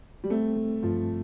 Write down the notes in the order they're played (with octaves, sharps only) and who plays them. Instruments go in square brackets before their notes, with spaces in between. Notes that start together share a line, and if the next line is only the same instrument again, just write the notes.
[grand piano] G3
[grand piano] A3 [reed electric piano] C4
[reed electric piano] A3
[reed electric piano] G2 [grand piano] F3